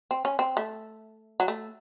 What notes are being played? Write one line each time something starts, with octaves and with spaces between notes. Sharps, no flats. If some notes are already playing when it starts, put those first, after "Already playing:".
C4
C#4
C4
A3
F#3
A3